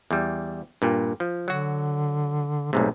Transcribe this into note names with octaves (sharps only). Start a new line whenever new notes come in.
E2 G3
G2 A#2
F3
D3 F#3 F#4
B1 G#2 C3 A3